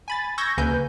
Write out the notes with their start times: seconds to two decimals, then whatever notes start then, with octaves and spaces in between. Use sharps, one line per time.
0.08 G#5 B5 A6
0.38 C#6 E6 G6 G#6 A#6
0.58 D2 C#3 A#3 B4 G#5 G6